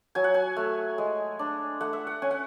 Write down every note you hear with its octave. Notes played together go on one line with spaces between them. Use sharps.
F#3 G#5
F#5
G#5
A3
G#3
D4
A3 F#5
E5
F#5
C#4 G#5
F#5